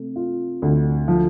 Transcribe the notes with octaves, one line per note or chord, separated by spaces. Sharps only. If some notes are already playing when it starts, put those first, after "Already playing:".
Already playing: C3 A3
F4
D2
F3